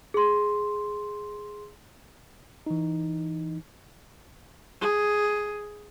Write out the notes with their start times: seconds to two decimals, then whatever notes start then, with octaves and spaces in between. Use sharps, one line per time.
0.14 G#4 C6
2.67 E3 D#4
4.81 G#4